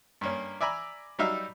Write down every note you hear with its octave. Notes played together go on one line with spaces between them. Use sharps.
G2 A#3 C#4
D5 E5 G#5 A#5 B5
F#3 G3 D#4 E5 F5